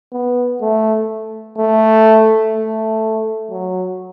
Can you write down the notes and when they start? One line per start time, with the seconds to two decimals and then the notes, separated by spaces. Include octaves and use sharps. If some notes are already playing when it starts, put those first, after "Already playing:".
0.13 B3
0.61 A3
1.58 A3
2.54 A3
3.51 F#3